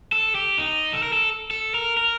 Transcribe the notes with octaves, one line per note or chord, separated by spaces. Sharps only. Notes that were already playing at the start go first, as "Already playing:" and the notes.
A4
G4
D#4
A4
A#4
A4
A4
A#4
A#4